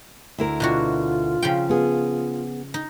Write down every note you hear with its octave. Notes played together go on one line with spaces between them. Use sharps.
D2 E4 A#4
B2 D4 F4 F#4
C#3 F3 G5
B3 G#4
D#4